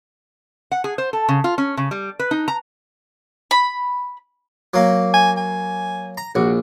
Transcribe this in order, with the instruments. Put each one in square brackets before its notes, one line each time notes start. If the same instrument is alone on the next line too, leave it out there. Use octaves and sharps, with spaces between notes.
[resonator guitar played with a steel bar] F#5
G#4
C5
A4
C#3
F4
C#4
C#3
G3
B4
D#4
A#5
[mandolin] B5
[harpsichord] F#3 A#3
[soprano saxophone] G#5
G#5
[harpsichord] A#5
[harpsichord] A#1 [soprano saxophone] F#4